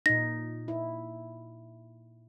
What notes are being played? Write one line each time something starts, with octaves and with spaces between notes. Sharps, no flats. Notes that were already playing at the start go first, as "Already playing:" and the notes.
A#2 D#4 A#6
E4